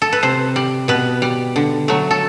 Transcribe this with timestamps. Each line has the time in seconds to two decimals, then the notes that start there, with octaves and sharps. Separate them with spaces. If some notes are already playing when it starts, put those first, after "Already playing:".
0.02 A4
0.13 B4
0.23 C3 C5
0.56 G3
0.88 B2 B4
1.22 G3
1.56 D3
1.88 F#3 A3
2.11 A4